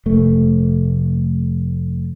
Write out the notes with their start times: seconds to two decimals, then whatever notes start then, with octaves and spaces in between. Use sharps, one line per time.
0.06 F1 A3